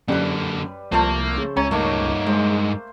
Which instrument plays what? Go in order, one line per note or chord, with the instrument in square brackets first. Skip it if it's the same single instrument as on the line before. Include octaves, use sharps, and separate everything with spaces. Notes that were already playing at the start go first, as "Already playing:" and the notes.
[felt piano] F#2 [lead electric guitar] D3 A#3 [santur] G3 B4
[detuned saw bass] C2 [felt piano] F3 [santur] A3 A4 C5 [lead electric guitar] A#3
[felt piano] C#3
[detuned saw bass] C#2 [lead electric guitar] C#4 [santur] C#5 [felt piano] A#5
[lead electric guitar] G2 D#4 [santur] A3 A#3
[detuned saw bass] G#3 [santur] C5